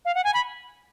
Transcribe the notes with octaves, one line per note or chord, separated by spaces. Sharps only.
F5
F#5
G#5
B5